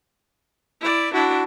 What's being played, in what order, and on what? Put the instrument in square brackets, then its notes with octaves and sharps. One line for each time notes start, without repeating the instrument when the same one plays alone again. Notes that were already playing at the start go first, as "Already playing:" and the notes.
[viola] E4 D5
[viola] D4 E4 [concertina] F#4